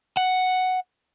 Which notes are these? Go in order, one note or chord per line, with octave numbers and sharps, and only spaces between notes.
F#5